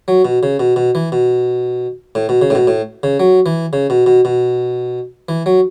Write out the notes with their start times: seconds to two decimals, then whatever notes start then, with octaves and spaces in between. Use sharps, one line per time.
0.08 F#3
0.25 B2
0.43 C#3
0.60 B2
0.76 B2
0.95 E3
1.12 B2
2.15 A2
2.29 B2
2.42 C#3
2.50 A2
2.55 B2
2.67 A2
3.03 C#3
3.20 F#3
3.46 E3
3.73 C#3
3.90 B2
4.06 B2
4.25 B2
5.29 E3
5.46 F#3